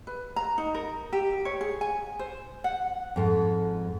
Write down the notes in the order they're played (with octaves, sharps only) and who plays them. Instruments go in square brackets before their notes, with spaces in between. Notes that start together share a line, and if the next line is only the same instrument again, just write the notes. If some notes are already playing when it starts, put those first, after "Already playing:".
[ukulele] B4
A#5
D#4
A#4
G4
C#5
G#4
G#5
C5
F#5
[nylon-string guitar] F2 G#2